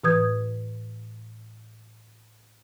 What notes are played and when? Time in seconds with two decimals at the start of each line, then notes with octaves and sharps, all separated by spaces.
0.04 A2 E3 B4 D#6 G6 G#6